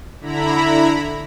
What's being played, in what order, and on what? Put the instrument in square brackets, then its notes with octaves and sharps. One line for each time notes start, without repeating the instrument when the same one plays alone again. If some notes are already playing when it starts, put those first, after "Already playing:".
[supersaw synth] D3 E4 A#5 B5